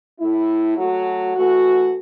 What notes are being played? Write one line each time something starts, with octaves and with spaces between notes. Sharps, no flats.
A2 A3 E4
F#3 A3 F#4
E3 A3 F#4